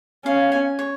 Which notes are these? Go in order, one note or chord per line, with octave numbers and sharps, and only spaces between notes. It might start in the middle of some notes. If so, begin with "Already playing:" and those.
C#4 F5
G#5
C#5